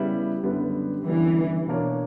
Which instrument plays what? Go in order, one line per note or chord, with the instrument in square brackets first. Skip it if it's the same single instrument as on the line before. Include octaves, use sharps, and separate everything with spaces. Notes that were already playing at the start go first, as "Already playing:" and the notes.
Already playing: [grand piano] C#3 G3 B3 E4
F#2 D3 G3 B3
[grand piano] F#2 D3 G3 B3 [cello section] E3
[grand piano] B2 A#3 D4 A#4 C#5